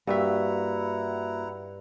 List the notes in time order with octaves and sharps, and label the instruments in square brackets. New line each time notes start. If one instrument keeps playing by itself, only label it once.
[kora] G2 [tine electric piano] A#3 F#4 E5 [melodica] E4 F#5 A#5